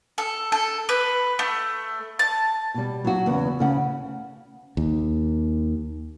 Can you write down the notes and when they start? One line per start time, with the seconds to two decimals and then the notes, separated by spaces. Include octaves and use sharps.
0.18 A4
0.52 A4
0.89 B4
1.39 A3
2.19 A5
2.74 B2 G3
3.04 F#3 F#4
3.26 E2 C#3 B3
3.59 D2 C#3 F#5
4.77 D#2